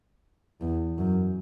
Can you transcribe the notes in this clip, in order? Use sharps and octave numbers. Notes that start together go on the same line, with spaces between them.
E2
F#2